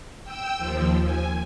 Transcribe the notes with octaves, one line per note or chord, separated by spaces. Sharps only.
G5 E6
D#2 F3
G#5